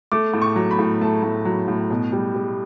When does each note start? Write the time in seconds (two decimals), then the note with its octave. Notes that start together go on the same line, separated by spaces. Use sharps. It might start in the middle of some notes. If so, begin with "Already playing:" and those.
0.12 A3 D6
0.34 A2
0.42 C#6
0.56 F#3
0.71 B5
0.79 A2
1.01 A3 A5
1.23 A2
1.45 F#3
1.68 A2
1.90 B2
2.12 G3
2.35 G3